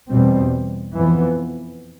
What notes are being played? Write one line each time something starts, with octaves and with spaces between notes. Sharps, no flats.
E2 B2 G3 C4
F2 E3 B3